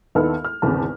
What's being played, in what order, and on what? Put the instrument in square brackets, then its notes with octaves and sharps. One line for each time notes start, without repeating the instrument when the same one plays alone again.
[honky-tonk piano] D#2 B3 D#4 E4 A4 F6
F6
G#1 E2 C#3 A5